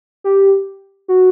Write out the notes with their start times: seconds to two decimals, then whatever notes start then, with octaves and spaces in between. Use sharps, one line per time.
0.24 G4
1.08 F#4